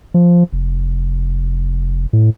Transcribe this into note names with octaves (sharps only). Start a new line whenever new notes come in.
F3
F1
A2